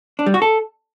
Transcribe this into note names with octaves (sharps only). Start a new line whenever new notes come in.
D4
G3
F#4
A4